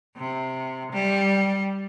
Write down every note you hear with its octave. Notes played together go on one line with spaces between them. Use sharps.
C3
G3